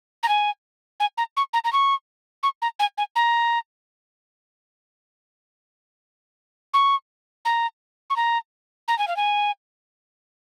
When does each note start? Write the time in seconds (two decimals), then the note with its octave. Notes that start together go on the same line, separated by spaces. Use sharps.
0.23 A#5
0.28 G#5
1.00 G#5
1.18 A#5
1.37 C#6
1.53 A#5
1.64 A#5
1.73 C#6
2.43 C#6
2.62 A#5
2.79 G#5
2.98 G#5
3.16 A#5
6.74 C#6
7.45 A#5
8.10 C#6
8.16 A#5
8.88 A#5
8.98 G#5
9.08 F5
9.16 G#5